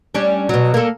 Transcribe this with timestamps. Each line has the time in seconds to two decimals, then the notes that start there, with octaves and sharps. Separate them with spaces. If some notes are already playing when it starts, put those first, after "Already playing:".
0.15 G3 C#4 D4
0.49 B2 F#3
0.74 A#3 A4